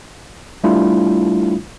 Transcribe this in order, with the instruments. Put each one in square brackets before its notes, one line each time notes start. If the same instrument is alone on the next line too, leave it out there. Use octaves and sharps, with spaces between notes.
[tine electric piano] G3 A3 D4 E4 F4